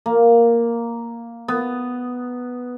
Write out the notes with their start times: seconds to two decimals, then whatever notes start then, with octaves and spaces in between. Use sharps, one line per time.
0.06 A#3
1.48 B3